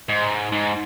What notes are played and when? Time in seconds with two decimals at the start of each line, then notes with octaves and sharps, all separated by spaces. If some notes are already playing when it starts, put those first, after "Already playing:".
0.09 G#2
0.52 G#2